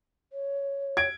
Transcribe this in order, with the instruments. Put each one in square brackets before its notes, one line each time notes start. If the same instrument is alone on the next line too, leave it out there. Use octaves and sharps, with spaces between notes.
[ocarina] C#5
[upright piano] G#6 D7